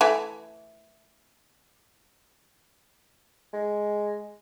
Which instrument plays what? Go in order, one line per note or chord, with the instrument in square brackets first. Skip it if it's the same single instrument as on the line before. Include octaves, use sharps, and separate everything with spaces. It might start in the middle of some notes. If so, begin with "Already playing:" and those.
[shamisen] E3 A3
[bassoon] G#3